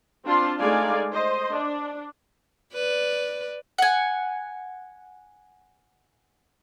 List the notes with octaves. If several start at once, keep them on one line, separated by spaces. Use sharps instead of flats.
C4 D4 F4 A5 C6
G#3 A3 D#4 D5 F5 G#5
C5 D#5
D4
B4 D5
F#5 G#5